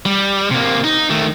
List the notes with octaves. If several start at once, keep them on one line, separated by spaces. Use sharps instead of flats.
G3
C3 A#3
D#4
D#3 A3